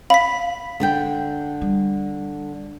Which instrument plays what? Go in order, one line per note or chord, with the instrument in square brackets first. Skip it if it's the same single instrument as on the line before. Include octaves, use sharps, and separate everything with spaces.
[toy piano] F5 [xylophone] B5 B6
[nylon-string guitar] D3 D4 G5
[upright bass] G3